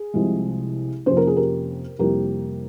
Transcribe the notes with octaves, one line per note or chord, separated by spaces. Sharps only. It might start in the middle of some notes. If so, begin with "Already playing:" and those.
Already playing: G#4
C2 C3 F3 G#3
F2 C3 F3 A#3 C#4 C5
A#4
G#4
G4 A#4
F2 C3 G3 A#3 E4 G4 A#4